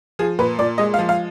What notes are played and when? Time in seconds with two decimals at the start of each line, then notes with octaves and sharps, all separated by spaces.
0.19 F3 G#4
0.39 A#2 B4
0.59 A#2 D5
0.78 G#3 D#5
0.94 F5
0.98 F3
1.09 F5